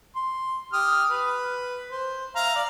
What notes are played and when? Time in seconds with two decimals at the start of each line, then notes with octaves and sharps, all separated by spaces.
0.16 C6
0.73 G4 D#6 F6
1.10 B4
1.91 C5
2.36 E5 F5 A#5
2.55 D5 F5